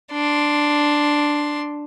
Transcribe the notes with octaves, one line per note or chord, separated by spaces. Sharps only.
D4 C6